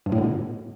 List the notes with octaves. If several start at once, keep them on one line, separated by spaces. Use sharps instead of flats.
G2
A2
D3
B2